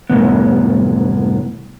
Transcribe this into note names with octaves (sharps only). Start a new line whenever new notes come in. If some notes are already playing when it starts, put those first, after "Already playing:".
C2 F#2 A2 C3 B3